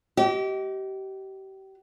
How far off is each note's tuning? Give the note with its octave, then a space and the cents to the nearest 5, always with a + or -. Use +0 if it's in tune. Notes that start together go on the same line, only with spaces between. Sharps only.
G4 -30 D#5 +25